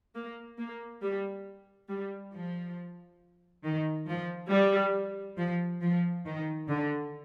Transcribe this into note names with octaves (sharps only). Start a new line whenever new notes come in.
A#3
A#3
G3
G3
F3
D#3
F3
G3
F3
F3
D#3
D3